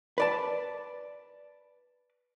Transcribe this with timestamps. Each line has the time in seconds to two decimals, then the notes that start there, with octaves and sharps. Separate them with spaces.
0.18 B4 D5 A5